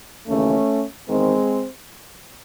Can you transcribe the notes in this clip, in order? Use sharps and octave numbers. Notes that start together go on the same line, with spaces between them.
D#2 C#3 E3 A3 C#4
E2 D#3 G#3 C4